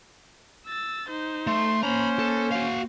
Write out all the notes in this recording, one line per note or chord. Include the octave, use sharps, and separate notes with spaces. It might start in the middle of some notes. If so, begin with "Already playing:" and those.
E6 A6
D#4 C5
A3 C6
A#3 C#4 C5 A#5 B5
A4
F#4 F5